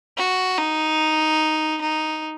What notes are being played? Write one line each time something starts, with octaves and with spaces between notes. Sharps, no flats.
F#4
D#4
D#4